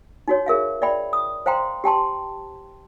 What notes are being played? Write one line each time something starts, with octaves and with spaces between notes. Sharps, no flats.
D#4 F#4 C#5
G#4 A#4 E5 F5
D5 E5 G5 B5
D#6
C5 F5 G5 A#5 C6
G4 G5 A5 C6